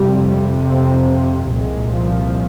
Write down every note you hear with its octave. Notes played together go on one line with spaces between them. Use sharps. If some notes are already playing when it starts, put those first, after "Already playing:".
Already playing: F2 C3 G3
C4
C2 A#2 G#3
F3